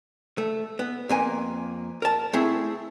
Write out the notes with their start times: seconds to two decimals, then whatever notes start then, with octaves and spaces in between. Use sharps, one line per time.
0.38 A3
0.79 B3
1.09 F2 A#3 G#5
2.02 A#4 A5
2.33 A3 C4 E4 G#4